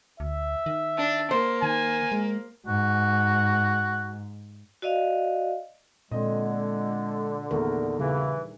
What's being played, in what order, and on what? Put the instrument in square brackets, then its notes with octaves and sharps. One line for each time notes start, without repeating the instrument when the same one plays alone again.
[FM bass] D2 [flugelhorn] E5
[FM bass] D#3
[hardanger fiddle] D4
[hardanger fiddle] A#3 [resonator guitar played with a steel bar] C5
[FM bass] D#3 [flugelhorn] G#5
[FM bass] G#3
[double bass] G#2 [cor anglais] F#4
[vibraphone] F#4 D5 D#5 F5
[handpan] A#2 [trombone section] D3 [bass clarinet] G#3 [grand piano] C4 D#5
[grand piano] E2 A#2 A3 [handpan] D#3 D4 A#4
[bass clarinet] C#3 [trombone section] E3 [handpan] G3